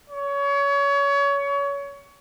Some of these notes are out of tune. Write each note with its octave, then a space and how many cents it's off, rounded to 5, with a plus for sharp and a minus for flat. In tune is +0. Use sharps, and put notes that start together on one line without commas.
C#5 +25